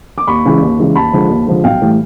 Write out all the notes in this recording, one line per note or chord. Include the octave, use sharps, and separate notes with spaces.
D6
D#2 B5 C#6
C#3 E3 G#3
D#2
C#3 E3 G#3
D#2 A5 B5
D3 F3 G#3
D#2
D3 F3 G#3
B1 F5 G5
A2 E3 G3